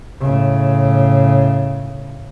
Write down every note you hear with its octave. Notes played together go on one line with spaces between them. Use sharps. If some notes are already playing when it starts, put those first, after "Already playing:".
A2 C#3